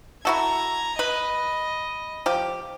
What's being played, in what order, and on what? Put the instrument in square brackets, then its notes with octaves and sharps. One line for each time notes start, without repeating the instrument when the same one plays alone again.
[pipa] E4 F#4 A4 [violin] A#5 G#6
[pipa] B4 [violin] D#5
[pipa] F3 G4